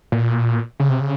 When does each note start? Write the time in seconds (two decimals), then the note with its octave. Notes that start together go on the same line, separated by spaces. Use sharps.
0.12 A#2
0.80 C#3
0.89 C3
1.00 C#3